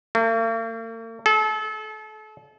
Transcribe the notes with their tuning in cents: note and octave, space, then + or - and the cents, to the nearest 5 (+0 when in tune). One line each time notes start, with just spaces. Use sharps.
A#3 -45
A4 -35